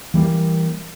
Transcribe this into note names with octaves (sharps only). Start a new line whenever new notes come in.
E3 G3 A#3